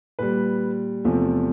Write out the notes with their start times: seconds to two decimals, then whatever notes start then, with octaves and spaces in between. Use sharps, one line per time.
0.19 A#2 G3 B4
1.04 E2 C3 F3 A3